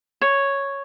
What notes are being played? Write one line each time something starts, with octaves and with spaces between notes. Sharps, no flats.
C#5